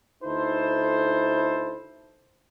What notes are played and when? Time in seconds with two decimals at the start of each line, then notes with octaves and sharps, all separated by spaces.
0.23 D2 D#4 E4 A4 B4 C5